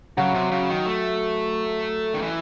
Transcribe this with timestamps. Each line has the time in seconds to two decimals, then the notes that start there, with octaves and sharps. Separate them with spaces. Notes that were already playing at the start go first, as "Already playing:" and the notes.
0.17 C#3 F#3 F#4
0.34 C3
0.51 C#3
0.69 D#3
0.86 A3
2.14 D#3
2.22 E3